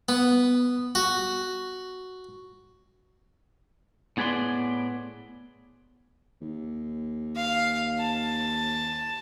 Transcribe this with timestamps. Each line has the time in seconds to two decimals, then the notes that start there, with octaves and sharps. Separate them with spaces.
0.09 B3
0.95 F#4
4.17 A2 B3 G#4 B4 D5 C6
6.41 D#2
7.36 F5
7.99 A5